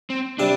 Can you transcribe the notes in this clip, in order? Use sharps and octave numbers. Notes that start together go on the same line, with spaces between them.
C4
C3 G3 D4